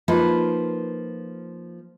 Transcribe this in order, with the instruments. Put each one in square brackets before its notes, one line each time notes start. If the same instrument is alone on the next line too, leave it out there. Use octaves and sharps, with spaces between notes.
[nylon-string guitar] F3 A#3 D#4 B4